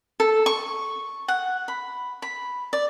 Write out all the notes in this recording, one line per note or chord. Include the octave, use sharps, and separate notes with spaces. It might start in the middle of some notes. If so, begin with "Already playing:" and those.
A4
C#6
F#5
B5
B5
D5